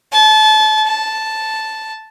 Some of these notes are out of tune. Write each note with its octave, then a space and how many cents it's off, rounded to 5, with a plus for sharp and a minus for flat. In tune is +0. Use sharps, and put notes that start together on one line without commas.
A5 -30
A5 -5